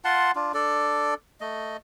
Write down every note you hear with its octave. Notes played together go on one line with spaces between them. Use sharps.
F4 F#5 A5 C6
D4 F4
D4 A4 D5
A3 D#5